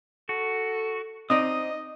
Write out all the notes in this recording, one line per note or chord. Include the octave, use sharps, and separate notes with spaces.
F#4 A4
C4 D#4 D5 D#5 D#6